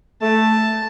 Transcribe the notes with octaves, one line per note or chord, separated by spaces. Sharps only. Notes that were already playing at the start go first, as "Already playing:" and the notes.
A3 A5